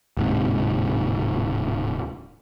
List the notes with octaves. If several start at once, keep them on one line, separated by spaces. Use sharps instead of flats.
D1 G#2 C3